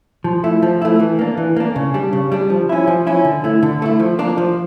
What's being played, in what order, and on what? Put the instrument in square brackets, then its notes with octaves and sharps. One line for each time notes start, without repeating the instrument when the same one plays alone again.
[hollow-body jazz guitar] F3
A3 E4
F3
A3 E4
E3
A#3 D4
E3
A#3 D4
C#3
G3 D4
C#3
G3 D4
F3
C#4 E4
F3
C#4 E4
D3
A3 E4
D3
A3 E4
F3
A#3 D4
F3